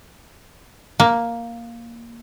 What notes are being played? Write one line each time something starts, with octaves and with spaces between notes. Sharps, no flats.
A#3